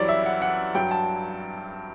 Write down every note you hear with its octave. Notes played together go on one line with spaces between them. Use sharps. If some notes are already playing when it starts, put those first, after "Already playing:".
Already playing: F#2 E3 G3 C#5 D5
E5
F#5
F#5
G2 F#3 G5
A5